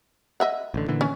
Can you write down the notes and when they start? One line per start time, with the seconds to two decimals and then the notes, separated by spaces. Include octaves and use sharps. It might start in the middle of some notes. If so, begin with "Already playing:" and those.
0.40 D#5 E5 F#5
0.74 A1 D3
0.88 A#2 D3 E3
1.01 C#4